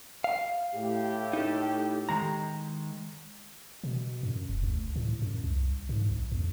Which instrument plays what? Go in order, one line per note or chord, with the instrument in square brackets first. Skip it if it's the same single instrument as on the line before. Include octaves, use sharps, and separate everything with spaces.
[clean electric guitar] F5
[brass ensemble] A2 G4
[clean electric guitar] D#4 A4
D#3 G#3 A#5
[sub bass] B2
F#2
E1
D2
A2
F#2
C2
G#2
A#1
E2